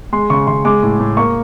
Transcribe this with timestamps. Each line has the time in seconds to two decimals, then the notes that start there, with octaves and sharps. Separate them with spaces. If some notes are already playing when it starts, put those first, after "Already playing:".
0.13 G#3 C6
0.30 C#3 C#6
0.47 C#3 C6
0.65 G#3 D6
0.83 A2
1.00 A2
1.17 A#3 C#6